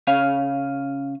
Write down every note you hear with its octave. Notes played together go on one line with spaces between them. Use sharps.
C#3 C#4 F5